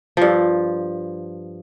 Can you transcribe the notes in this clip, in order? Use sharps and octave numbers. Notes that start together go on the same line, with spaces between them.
G2 F3